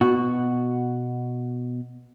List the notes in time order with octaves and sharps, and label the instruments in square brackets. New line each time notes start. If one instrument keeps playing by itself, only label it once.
[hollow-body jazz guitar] B2 F#4